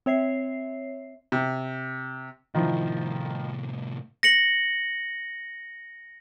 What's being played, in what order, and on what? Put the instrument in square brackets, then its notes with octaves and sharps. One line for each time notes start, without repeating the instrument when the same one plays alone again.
[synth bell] C4 C#5 E5 C7
[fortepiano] C3
[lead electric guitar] C2 A2 [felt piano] D#3 F3 E4
[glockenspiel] A#6 C#7 F#7